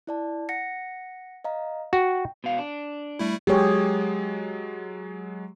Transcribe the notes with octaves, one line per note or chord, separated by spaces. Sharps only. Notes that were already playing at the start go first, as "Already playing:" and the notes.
E4 D5 A5
F#5 A#6 C#7
D#5 F5 A#5
F#4 G5
B2 F5
D4
G3 A3 E4
F#3 G#3 G4 G#4 C#5